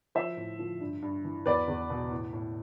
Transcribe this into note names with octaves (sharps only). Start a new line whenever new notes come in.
F3 C5 E5
A2
F3
G2
G2
E3
E2 B4 D5
E2
B2
A2
A2